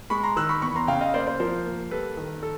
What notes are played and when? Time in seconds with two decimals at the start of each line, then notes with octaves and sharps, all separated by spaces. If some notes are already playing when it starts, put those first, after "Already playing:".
0.10 G#3 B5 C#6
0.23 A#5 C6
0.37 D#3 E6 F#6
0.49 B5 C#6
0.62 E2 B5 C#6
0.75 A#5 C6
0.88 C#3 F5 G5
1.01 D#5 F5
1.14 A#3 C5 D5
1.26 C5 D5
1.40 F3 A#4 C5
1.66 A#3
1.91 G3 A4 B4
2.17 D#3
2.43 A4